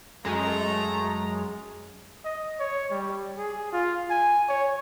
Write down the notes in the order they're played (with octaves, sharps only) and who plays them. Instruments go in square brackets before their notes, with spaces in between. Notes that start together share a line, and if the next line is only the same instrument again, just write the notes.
[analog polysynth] F#2 G#3 [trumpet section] A3 A#5
[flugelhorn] D#5
C#5
G3
G#4
F4
G#5
C#5